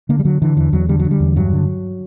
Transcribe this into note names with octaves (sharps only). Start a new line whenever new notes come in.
D3 A#3
G3
D3 F#3
D3 E3
E2 E3
E2 F#3
D3 G3
F#3
D3
G3
E2
G2 F#3
D3